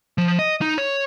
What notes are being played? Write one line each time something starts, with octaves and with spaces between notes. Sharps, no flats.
F3
D#5
D#4
C#5